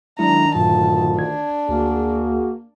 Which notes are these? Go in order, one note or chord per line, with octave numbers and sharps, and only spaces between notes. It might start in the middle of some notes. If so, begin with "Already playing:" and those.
D#3 F#3 G#3 D4 E4 A#5
D2 G2 A#2 E3 F#3 F4 A5
D4 G#6
D2 A#3 F#4 G#4